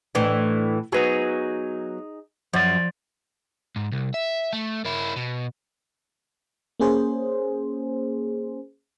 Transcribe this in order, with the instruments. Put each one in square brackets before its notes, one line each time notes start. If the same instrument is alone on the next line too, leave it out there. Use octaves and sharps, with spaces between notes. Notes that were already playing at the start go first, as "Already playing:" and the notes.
[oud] A2 E3 D4
[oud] F#3 B3 [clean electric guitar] D#4 G#4
[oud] F#2 [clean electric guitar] F3 D5
[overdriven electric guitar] G#2
C2
E5
A3
A#3 E4
B2
[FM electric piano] A#3 C#4 G#4 C5